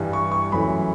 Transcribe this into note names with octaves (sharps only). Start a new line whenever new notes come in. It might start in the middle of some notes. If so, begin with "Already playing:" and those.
Already playing: G2 E3 G3
C#6
C#6
F#2 E3 A3 B5